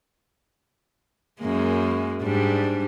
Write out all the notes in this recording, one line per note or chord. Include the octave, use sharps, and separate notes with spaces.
F#2 G#3 A#3
G#2 G3 D4